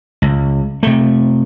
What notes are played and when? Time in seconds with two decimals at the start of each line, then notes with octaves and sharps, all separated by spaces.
0.22 C#2
0.83 C3 A3